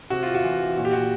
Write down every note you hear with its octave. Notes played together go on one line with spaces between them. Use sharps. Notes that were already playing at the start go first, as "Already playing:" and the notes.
C3 F#4
F4
F#4
E3
A#2 F#4
G4
F#4